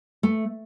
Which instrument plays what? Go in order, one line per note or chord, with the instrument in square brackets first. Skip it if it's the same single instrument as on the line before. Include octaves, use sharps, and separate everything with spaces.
[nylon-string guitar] A3